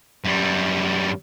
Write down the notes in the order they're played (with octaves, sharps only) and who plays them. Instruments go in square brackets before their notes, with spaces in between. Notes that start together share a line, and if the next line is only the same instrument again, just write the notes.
[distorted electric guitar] F#2 G3